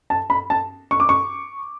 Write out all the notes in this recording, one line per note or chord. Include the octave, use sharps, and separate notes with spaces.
A5
B5
A5
C#6
D6
C#6